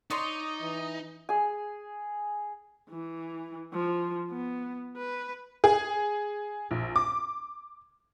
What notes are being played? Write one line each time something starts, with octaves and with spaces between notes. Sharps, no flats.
D#4 C#5 D5 C6 D#6
E3
G#4 G#5
E3
F3
B3
B4
G#4
A#1
D6